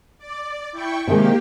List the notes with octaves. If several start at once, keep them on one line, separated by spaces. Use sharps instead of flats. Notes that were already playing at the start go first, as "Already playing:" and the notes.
D5
E4 G5 C#6
C3 D#3 G#3 A#3 G4